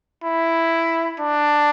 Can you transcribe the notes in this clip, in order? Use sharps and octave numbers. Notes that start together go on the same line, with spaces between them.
E4
D4